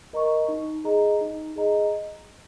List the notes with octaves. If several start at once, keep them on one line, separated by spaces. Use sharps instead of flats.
A#4 D#5 A#5 C#6
D#4
G#4 D#5 A#5
D#4
G#4 D#5 A#5